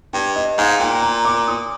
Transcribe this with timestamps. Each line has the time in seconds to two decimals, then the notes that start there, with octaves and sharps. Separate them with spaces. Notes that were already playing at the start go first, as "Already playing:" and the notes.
0.13 G2 G5
0.36 D#5
0.58 G#2 F5
0.80 A#2 G5
1.02 A#5
1.25 D6
1.48 D#6